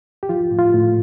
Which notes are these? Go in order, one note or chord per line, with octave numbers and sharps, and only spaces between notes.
G4
F3 F4
A2
F4
A2